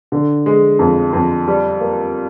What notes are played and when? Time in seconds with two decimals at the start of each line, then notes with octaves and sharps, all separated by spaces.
0.12 D3
0.46 G#3
0.79 F2
1.13 F2
1.48 G3
1.80 A#3